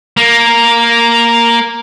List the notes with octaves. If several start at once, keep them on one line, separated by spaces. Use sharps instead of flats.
A#3